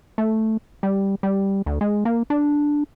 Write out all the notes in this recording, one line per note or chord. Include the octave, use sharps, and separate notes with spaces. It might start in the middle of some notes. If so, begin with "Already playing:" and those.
A3
G3
G3
D2
G#3
A#3
D4